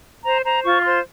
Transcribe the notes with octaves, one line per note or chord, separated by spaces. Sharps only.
C5 A#5
C5 A#5
F4 C#6
C#6
C5 C6